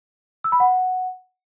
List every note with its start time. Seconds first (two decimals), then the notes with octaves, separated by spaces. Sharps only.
0.44 E6
0.52 B5
0.60 F#5